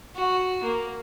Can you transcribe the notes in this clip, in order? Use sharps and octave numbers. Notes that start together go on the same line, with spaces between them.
F#4
A#3